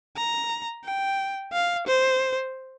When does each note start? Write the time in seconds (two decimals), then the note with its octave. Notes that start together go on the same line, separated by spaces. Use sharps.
0.16 A#5
0.85 G5
1.53 F5
1.87 C5